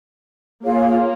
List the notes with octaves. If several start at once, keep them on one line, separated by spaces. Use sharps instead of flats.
A#3 F4 G#4 C#5 F5